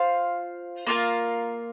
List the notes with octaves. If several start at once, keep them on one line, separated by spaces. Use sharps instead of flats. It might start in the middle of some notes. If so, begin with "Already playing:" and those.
Already playing: F4 C5 F5
A#3 F4 A#4